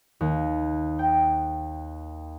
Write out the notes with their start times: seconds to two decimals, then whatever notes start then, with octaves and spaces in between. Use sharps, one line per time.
0.20 D#2
0.99 G5